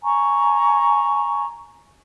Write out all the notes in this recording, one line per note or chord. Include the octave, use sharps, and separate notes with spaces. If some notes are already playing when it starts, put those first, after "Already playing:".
G#5 A#5 C#6